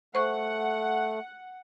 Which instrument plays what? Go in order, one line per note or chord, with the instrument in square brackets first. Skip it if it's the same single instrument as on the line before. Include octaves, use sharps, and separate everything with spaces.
[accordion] A3 [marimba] C5 C#6 [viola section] F#5